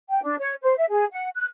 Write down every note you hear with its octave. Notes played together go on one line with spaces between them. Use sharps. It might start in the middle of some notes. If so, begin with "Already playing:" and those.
G5
D4
C#5
C5
E5
G#4
F#5
F#6